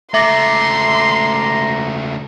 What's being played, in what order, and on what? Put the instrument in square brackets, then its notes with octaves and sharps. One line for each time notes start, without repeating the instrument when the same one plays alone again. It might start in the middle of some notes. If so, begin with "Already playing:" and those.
[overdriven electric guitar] C#2 A3 [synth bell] E5 D6 [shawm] A#5 [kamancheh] C6